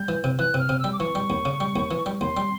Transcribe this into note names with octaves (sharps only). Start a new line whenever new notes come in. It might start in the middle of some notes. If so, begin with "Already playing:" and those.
Already playing: G3 G6
E3
C3
E3 F#6
C3 F6
C3
G3 E6
D6
E3 C#6
G3
D#2
C#3
G3
D#2
E3
G3
D#2 C6
G3